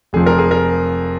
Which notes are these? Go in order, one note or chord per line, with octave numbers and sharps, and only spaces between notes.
F1 F2 F3 G#4
A#4
G#4
A#4